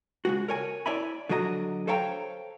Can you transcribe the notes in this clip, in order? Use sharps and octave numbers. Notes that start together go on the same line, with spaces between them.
C#3 G#3 F#4
A#4 C#5 G#5
E4 C#5 D5 E5 G#5 B5
D3 F#3 F#4 D#5 A#5
A4 C5 C#5 F5 G5 A#5